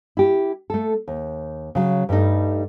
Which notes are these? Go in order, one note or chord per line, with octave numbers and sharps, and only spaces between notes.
E4 G4
A3 A4
D#2
C#3 F#3
G2 G3 A3 D#4